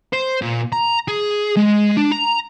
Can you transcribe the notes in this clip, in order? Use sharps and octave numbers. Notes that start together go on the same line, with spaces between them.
C5
A#2
A#5
G#4
G#3
D4
A#5